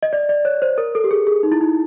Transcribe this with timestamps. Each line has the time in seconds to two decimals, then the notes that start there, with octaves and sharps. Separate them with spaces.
0.03 D#5
0.13 D5
0.29 D5
0.45 C#5
0.62 C5
0.78 A#4
0.95 A4
1.04 G4
1.11 G#4
1.27 G#4
1.43 D#4
1.52 E4
1.61 D#4